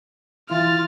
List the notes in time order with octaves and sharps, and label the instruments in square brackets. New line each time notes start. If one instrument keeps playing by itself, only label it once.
[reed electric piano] E3 E4 [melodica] F4 [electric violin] F6 A6